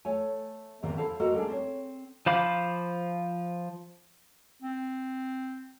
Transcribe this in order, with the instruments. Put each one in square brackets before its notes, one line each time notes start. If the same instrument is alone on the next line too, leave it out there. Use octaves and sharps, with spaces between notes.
[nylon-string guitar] A3 C#5 G#5
E2 G#2 C3 D#3 A#3
E4 A4 C5 F5 A5
G#3 A#3 F#4 A4 A#4
G3 A#3 D4 G#4
C4 C#5
[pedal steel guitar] F3 C5 F5 B5 D6
[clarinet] C4